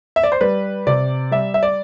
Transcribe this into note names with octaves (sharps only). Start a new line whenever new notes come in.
E5
D5
C5
G3 B4
C3 D5
G3 E5
E5
D5